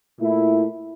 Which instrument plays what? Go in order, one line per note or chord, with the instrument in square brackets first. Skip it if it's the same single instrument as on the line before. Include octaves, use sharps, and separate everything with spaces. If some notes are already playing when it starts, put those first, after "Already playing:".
[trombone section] A#2 A3 E4